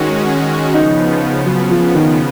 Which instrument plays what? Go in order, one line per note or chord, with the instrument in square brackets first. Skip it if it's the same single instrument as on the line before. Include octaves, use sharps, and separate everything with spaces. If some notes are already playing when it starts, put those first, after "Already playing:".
Already playing: [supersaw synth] D#3 G#3 C#4 F#4
[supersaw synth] C#3 F3 B3 [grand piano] D#4
[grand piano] F#3
F3
D#3